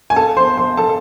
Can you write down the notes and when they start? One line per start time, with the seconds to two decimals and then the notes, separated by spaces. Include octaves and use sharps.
0.10 G#5
0.16 A4 A5
0.37 C5 C6
0.57 C5 C6
0.77 A4 A5